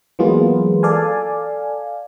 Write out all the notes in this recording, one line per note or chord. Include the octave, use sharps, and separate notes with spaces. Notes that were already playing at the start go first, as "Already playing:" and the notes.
E3 F#3 G#3 A#3 B3 F4
A4 D5 F5 G#5